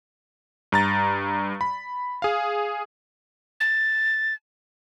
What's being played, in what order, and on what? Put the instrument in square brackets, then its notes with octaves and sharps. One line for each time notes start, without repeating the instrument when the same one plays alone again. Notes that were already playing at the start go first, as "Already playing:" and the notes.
[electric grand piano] G2 A#5 A6
B5
G#4 F5
[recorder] A6